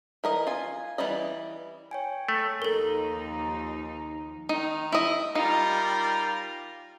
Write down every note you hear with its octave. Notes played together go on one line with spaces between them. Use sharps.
E3 A#4 D#5
F4 G#5
E3 G3 D5 D#5
C#5 G5 G#5
A3
D#2 F3 D#4 A4 A#4
D#3 D#4
E4 D#5
G3 D#4 F4 A#4